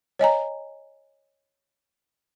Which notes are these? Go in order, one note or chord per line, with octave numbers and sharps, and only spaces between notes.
C#5 D#5 G#5 A#5